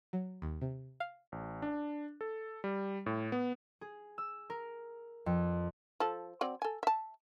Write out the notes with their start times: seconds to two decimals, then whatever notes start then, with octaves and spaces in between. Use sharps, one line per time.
0.13 F#3
0.42 D#2
0.61 C3
1.00 F5
1.32 A1
1.62 D4
2.21 A4
2.64 G3
3.06 A2
3.32 B3
3.81 G#4
4.18 E6
4.50 A#4
5.26 F2
6.00 F3 A4
6.41 F#3 C4 D5
6.62 A4 G#5
6.83 E5 A5